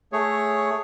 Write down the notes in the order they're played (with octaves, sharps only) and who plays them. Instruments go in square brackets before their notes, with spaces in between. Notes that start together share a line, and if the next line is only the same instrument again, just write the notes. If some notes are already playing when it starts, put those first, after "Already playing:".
[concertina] A3 G#4 C#5